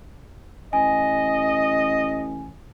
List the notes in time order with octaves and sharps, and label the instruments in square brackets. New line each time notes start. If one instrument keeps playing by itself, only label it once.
[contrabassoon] A1 [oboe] D#5 [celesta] G#5